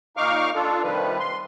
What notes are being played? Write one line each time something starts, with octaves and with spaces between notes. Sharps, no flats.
A#2 D#4 F5 C#6 D6 F6
D4 F4 A4
C3 D#3 F3 G3 B4
C6